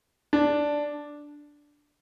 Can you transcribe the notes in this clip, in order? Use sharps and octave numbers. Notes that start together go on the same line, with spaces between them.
D4